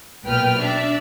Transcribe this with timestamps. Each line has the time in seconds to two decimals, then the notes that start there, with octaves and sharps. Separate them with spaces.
0.24 B1 A#2 B4 G5 F6
0.59 D4 D5 E5